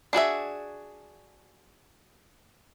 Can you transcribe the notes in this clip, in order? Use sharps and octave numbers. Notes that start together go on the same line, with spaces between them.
D4 F#4 G#4 E5